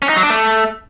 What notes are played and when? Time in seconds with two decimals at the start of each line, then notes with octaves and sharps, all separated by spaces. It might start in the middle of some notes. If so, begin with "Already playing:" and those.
0.02 C#4
0.09 D#4
0.16 F#3
0.23 D4
0.30 A3